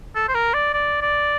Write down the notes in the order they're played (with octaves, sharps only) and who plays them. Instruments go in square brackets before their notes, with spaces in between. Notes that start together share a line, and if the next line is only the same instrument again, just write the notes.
[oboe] A4
C5
A#4
D5
D5
D5